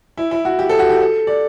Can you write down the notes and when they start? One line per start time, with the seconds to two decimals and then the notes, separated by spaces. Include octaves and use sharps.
0.18 E4
0.31 E4
0.45 F#4
0.59 G4
0.69 A4
0.79 F#4
0.89 G4
1.00 A4
1.27 D5